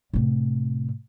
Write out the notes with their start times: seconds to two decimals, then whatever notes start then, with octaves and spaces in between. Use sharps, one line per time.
0.14 A2 C3